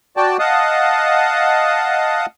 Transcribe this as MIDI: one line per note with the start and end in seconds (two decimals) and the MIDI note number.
0.17 0.37 66
0.17 0.37 74
0.17 0.37 79
0.17 0.37 81
0.39 2.26 75
0.39 2.26 77
0.39 2.26 78
0.39 2.26 81
0.39 2.26 87